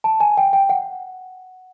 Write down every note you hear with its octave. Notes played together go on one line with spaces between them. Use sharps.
A5
G#5
G5
G5
F#5